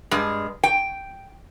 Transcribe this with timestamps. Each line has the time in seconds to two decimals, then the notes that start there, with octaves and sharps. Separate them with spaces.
0.11 G2 G#3
0.64 G5